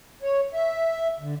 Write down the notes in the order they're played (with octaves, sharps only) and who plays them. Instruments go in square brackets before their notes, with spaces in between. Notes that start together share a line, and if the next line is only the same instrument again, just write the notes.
[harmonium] C#5
E5
D3